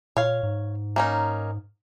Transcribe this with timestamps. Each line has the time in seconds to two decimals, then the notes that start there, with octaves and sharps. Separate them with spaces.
0.17 A#2 C#5 F5
0.43 G#2
0.96 A#3 C#4 D#4